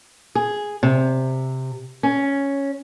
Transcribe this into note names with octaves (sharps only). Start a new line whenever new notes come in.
G#4
C3
C#4